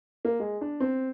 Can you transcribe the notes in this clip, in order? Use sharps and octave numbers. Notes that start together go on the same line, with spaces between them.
A#3
G#3
D4
C4